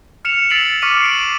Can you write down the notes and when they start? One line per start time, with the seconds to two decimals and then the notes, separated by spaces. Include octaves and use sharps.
0.25 F6 C#7 E7 F7
0.50 E6 A6 B6 C7 D7 F#7
0.82 C#6 D6 F6 B6 C#7 D#7
1.02 C7 D7 F#7